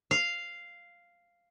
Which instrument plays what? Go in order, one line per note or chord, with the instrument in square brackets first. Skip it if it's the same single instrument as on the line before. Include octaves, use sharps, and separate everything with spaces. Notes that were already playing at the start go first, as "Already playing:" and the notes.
[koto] F5